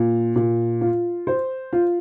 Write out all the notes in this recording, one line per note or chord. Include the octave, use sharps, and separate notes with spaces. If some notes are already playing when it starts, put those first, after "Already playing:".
Already playing: A#2
A#2
F4
C5
F4